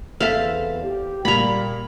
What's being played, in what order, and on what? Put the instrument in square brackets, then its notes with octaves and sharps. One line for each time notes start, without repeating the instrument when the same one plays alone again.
[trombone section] E2 [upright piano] C4 [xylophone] A4 E5 B6 [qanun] F5 A5
[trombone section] G4
[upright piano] A#2 A#3 [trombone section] G3 [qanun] A#5 B5